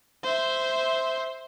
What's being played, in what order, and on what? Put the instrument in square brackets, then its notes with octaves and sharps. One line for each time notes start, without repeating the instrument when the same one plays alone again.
[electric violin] C5 E5